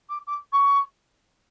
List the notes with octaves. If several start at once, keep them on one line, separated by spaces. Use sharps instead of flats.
D6
D6
C#6